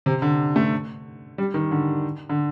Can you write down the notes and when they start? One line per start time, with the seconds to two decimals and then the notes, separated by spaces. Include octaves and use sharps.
0.06 C3
0.22 D3
0.56 A3
1.38 G3
1.54 D#3
1.71 D3
2.29 D3